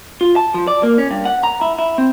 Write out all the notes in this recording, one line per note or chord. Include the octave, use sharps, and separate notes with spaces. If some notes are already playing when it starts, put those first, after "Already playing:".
F4
A5
F3
D5
A#3
C#4
G2
F#5
A#5
E4
E4
C4